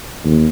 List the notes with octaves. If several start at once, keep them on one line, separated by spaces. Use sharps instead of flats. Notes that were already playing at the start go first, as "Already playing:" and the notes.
D#2